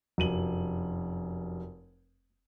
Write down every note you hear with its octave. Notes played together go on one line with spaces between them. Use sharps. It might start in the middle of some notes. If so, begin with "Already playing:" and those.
F1 F#2 D#7 F#7